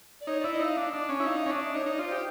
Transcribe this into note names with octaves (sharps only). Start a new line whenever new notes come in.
D5
D#4 C#5
E4 D5
D#5
D#4
F5
D4
D4
C#4
E4
D#4 F5
C#4 E5
D4
D#4 C#5
D#4
D5
F4
C5
G4